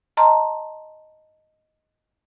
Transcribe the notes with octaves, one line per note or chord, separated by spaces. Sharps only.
D#5 A5 A#5 C6